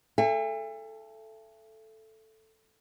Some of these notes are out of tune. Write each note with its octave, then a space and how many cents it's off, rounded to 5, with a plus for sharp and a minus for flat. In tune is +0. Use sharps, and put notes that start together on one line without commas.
A4 +0 E5 +30 G#5 -45